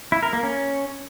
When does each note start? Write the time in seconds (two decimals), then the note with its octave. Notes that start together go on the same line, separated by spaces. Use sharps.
0.12 E4
0.23 A#4
0.33 A#3
0.43 C#4